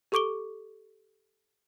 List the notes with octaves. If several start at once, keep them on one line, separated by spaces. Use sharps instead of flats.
G4 A4 C#6 D6 D7 G7